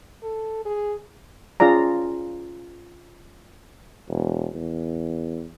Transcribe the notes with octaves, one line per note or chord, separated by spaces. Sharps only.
A4
G#4
C#4 F4 G#4 D5 A#5
E1
E2